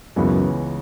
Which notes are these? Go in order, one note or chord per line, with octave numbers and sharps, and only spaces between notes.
C#2 F#2 C#3 E3 G#3 B3